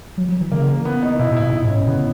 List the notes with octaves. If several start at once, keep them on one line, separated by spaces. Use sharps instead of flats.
F#3
F#3
E3
C#3 A#3
A#3
B3
D#4
B2 E4
A#2
E4
B2
A#2 D#4
G#2
C#4
A#2
C#3 B3